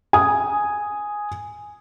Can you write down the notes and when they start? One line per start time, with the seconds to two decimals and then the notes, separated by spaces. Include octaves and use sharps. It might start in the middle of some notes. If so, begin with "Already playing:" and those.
0.13 G#5 D#6